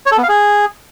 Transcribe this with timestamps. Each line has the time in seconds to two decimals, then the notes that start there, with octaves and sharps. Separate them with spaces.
0.06 C#5
0.12 A4
0.17 B3
0.23 F5
0.29 G#4